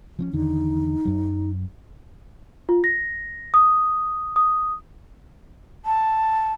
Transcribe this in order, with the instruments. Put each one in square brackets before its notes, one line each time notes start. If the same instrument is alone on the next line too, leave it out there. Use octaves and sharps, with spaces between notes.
[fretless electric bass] F3 C4 C#4
[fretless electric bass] E2 D3 D#3 [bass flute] D#4
[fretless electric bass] F#2 F#3
[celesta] F4
A#6
D#6
D#6
[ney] A5